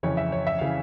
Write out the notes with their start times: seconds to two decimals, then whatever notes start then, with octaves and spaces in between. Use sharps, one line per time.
0.03 F2 C#3 E3 C#5
0.17 E5
0.32 C#5
0.47 E5
0.59 C#3 E3 F5